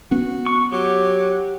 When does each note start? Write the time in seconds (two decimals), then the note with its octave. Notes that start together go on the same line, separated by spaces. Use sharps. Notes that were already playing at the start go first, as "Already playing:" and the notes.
0.11 B3 C#4 F#4
0.46 C#6
0.72 F#3 G4